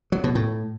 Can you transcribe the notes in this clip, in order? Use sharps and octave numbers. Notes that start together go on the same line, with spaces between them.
F#3
B2
A2